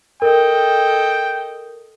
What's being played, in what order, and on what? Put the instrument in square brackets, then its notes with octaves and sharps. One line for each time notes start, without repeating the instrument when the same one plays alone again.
[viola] A4 D#5 [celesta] A#4 [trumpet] G5